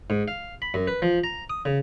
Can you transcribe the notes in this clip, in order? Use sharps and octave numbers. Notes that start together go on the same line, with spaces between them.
G#2
F5
B5
F#2
B4
F3
A#5
D#6
C#3